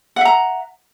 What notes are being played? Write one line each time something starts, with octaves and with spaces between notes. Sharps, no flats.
E5 F#5 A#5